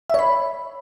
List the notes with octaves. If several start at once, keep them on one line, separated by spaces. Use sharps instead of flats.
C#5 E5 B5